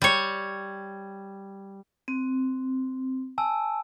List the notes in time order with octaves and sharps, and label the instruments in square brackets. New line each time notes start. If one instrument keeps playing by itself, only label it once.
[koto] G3 C#5
[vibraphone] C4
[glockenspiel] G#5 A5 E6